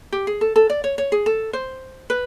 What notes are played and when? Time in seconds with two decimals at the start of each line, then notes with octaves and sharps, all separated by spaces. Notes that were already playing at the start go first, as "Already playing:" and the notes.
0.12 G4
0.27 G#4
0.41 A4
0.56 A4
0.70 D5
0.84 C#5
0.98 C#5
1.12 G#4
1.26 A4
1.53 C5
2.10 B4